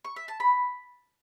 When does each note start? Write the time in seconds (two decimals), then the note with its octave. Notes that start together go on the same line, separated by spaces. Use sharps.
0.05 C#6
0.16 E5
0.28 A5
0.40 B5